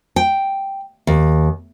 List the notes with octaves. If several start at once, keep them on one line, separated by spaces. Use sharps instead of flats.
G5
D#2